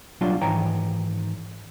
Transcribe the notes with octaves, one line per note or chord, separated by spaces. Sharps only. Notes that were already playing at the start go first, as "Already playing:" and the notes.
B1 F#3 G3 D4 F4 C6
G#2 D#3 E3 C#5 G5 A#5